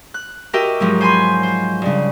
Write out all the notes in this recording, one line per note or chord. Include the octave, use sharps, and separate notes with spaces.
F#6
F#4 G4 A#4 D#5 E5 G5
G#2 F3 F#3
C5 G#5 B5 C6
C5
G2 C#3